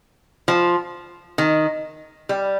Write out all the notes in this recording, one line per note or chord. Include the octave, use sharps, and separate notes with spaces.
F3
D#3
G3